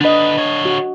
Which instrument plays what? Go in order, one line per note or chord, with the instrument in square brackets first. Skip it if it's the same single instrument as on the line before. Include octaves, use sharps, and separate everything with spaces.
[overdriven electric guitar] D3 B4 [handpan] D4 D#5
[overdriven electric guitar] D3 C#5
[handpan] F#4